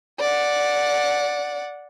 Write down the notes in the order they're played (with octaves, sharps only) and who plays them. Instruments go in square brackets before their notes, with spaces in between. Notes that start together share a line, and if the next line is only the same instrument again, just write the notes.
[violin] D5 F#5